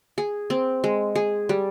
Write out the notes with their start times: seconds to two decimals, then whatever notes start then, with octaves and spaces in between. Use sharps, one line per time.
0.18 G#4
0.50 C4
0.84 G#3
1.15 G#4
1.49 G3